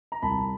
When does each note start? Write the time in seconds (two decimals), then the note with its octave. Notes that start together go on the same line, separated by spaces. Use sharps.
0.12 A#5
0.22 C2 A5 B5